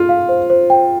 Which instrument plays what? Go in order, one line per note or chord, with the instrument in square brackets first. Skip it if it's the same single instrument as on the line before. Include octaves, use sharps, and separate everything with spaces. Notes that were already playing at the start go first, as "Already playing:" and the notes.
Already playing: [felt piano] F4
[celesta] F5
C5
C5
G5